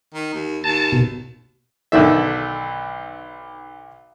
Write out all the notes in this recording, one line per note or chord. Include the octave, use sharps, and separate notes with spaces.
D#3
D#2
D#2 A5
B2
B1 D3 D#3 E5